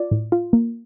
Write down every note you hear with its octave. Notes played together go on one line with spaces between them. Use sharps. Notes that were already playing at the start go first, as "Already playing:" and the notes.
Already playing: F4 D5
A2
F4
A#3